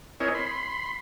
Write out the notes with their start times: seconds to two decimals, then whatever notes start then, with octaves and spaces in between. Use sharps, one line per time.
0.20 C4 E4 A#4 C#5 D#5 G#5
0.35 B5 C6